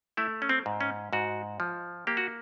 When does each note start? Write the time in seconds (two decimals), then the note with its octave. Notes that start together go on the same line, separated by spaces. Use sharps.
0.17 A3 E4
0.42 C#4
0.49 C4
0.66 G#2
0.81 C#4
1.13 G#2 F#4
1.60 F3
2.07 A#3 G4
2.17 F#4